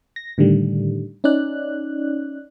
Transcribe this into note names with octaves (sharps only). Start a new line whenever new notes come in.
A#6
A2 D3 D#3 G3
C#4 D#4 D5 F#6